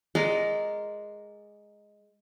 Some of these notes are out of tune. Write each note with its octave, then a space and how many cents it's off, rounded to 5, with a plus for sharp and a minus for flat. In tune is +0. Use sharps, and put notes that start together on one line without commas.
G#3 +0 A#4 +0 D5 -10